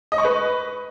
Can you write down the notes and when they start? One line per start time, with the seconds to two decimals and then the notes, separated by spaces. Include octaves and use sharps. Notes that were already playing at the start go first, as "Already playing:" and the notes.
0.12 D#5
0.18 C#6
0.24 B4